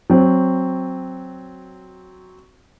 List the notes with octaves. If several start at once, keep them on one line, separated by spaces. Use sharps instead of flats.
F#3 C4